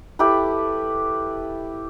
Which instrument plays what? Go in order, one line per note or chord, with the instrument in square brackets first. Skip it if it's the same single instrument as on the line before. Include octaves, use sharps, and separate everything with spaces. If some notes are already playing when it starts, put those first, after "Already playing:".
[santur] E4 G4 A4 B4